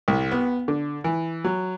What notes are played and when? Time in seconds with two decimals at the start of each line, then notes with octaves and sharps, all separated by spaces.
0.08 C2
0.31 B3
0.68 D3
1.04 E3
1.44 F#3